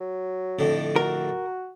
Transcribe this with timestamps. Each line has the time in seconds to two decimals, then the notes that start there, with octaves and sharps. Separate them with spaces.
0.01 F#3
0.59 F2 A2 D3
0.96 F#4 A#4